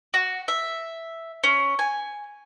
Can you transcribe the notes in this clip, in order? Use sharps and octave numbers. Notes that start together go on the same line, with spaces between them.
F#4
E5
C#4
G#5